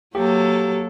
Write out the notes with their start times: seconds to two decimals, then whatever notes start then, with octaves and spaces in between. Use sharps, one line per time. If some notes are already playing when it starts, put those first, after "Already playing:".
0.15 F#3 A#3 G4 A4